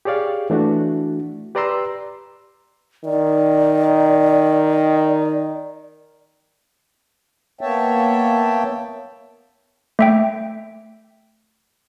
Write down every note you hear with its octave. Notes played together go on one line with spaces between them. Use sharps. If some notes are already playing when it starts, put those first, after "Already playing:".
G4 G#4 C#5 D5 F5
E3 A3 D4 F#4
G4 B4 D5 A#5 C6 E6
D#3 D5
A#3 B3 C#5 E5 G5 A5
A3 E5 G5